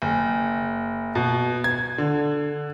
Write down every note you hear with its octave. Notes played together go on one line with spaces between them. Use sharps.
F#1
B2
G#6
D3